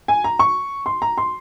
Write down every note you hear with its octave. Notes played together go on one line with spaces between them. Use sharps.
G#5
A#5
C#6
C6
A#5
C6